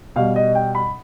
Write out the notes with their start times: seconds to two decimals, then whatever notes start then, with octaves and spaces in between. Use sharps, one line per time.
0.16 B2 G3 F5
0.36 D#5
0.55 G5
0.75 B5